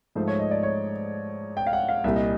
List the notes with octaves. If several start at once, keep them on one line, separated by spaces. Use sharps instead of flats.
G#2 F3 A3 C5
C#5
D#5
D5
C#5
G5
F5
F#5
F5
C2 A#2 G3 E5
D#5